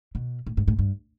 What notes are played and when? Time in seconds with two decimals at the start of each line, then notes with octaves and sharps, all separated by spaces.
0.15 B2
0.46 A2
0.57 G#2
0.68 A2
0.79 G2